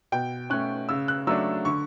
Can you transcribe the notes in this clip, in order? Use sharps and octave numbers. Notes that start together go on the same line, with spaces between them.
B2 G5
A3 C#4 F#6
C#3 E6
F#6
F#3 A3 D4 E6
D3 C#6